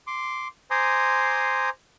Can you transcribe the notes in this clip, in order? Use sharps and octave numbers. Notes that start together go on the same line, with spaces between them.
C6 D6
C5 G#5 A#5 C6 D6 D#6